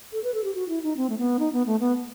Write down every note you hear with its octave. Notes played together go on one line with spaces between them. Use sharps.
A4
B4
A4
G4
F#4
E4
D#4
C4
A3
B3
D#4
B3
A3
B3